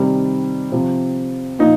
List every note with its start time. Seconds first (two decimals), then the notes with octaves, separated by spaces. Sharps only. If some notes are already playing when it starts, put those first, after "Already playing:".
Already playing: C3 D#3 G3
0.72 C3 F3
1.59 A#2 F3 D#4